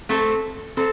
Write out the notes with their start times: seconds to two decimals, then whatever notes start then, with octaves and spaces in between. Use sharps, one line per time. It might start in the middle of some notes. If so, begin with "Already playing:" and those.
0.09 A3 C4 A4
0.77 C4 A4